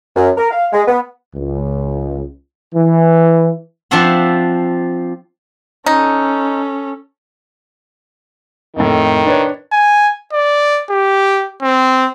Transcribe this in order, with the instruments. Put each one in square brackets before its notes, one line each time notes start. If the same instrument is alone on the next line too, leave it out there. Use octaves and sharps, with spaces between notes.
[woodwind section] F#2
A#4
F5
G#3
B3
[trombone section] C#2
E3
[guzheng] F3 C4 D4 E5 F#5 C6
[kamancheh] C#4 A4 [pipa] D#4
[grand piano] F2 A2 [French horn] D#3
[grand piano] D4 B4 C#5
[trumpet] G#5
D5
G4
C4